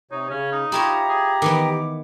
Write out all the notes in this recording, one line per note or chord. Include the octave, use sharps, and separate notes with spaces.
C3 D#4 C#5
C#3 C#4
D#4
E4 F4 G4 C#5 A#5
G#4
D#3 E3 B3 D6